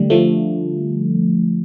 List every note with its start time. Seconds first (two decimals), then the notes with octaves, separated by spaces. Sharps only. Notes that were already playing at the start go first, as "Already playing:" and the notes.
Already playing: D3 G3 A3
0.10 F3 A3